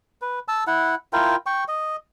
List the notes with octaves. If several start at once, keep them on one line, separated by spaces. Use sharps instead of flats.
B4
A5 E6
E4 F#5
E4 F4 A#4 G5
G5 C#6
D#5